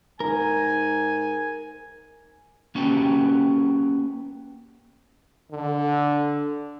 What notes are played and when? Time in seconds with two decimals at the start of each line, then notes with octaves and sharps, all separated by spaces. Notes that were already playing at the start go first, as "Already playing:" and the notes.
0.20 G#2 A#4 G#5
2.75 A#3 C#4 F#4 G4 B4
5.52 D3